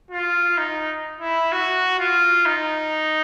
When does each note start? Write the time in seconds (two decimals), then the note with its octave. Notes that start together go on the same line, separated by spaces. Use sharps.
0.11 F4
0.57 D#4
1.21 E4
1.52 F#4
1.99 F4
2.46 D#4